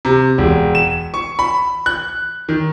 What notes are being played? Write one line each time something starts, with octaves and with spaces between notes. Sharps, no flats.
C3
E1
E7
C#6
B5
F#6
D#3